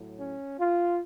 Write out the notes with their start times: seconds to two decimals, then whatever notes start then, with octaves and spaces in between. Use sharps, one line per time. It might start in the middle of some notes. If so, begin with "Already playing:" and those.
Already playing: A2 F#3
0.20 C#4
0.59 F4